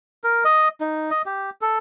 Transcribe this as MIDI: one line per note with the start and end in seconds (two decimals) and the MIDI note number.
0.24 0.44 70
0.45 0.68 75
0.81 1.10 63
1.10 1.22 75
1.26 1.50 67
1.61 1.78 69